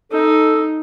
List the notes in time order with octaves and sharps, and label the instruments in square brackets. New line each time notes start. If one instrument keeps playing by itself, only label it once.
[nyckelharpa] D#4 [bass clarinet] A4